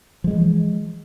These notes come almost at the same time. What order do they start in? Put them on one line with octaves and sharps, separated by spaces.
F3 G#3 E3